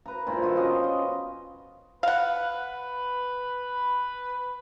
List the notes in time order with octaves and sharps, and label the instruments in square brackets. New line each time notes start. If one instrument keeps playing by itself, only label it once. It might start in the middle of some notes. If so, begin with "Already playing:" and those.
[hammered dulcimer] A#4 B4 A#5
G2 A#2 E4 C5
D#3 F4 F#4 A4
C#4 A#4 D#5
B3 G5
D#5
[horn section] B4 [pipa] F5 F#5